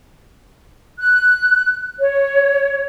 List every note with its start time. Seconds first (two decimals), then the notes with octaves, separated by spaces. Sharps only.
0.99 F#6
1.99 C#5